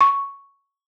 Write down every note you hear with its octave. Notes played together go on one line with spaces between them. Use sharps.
C#6